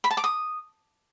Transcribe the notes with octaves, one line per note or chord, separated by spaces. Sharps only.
B5
A5
D6
D#6